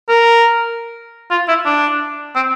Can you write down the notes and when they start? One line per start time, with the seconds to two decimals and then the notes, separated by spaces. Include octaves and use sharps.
0.09 A#4
1.31 F4
1.48 E4
1.65 D4
2.35 C4